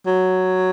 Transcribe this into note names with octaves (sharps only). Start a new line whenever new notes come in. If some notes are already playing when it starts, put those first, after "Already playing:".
F#3